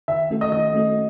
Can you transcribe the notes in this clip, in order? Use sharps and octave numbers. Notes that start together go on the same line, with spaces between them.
D#3 E5
A3 C#4 F#4 A4
D#5
D#3 D#5
A3 C#4 F#4 A4